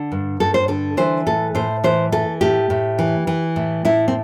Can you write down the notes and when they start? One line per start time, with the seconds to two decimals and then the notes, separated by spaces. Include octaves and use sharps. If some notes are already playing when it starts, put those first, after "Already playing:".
Already playing: D3
0.12 G2
0.40 G2 A4
0.54 C5
0.68 D3 A4
0.97 E3 C5
1.26 A2 A4
1.55 A2 C5
1.84 E3 C5
2.12 E3 A4
2.41 A2 G4
2.70 A2
2.99 E3
3.27 E3
3.56 A2
3.85 A2 E4
4.08 C4